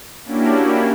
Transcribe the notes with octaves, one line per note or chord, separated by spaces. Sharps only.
A#3 C#4 D4 E4 F#4 G4